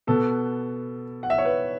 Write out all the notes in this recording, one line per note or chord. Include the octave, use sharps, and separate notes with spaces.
B2 B3 A4
F#5
E5
C#5
B4